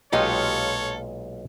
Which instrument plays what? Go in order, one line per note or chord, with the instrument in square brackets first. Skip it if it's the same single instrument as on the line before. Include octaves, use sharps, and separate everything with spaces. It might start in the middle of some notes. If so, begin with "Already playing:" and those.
[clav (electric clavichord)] B1 A#2 G#3 [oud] F4 G4 D#5 [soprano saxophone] A4 [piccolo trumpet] C#5